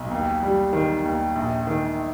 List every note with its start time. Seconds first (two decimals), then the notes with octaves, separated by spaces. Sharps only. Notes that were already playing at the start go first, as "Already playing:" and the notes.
Already playing: B1
0.11 D#2
0.42 G3
0.73 D#3
1.04 D#2
1.35 A#1
1.67 D#3